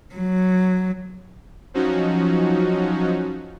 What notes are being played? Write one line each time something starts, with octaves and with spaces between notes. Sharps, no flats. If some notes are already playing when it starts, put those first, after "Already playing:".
F#3
F3 F#3 C#4 D#4 F#4